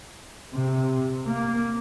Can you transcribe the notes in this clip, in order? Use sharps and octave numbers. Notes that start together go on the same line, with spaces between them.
C3
A#3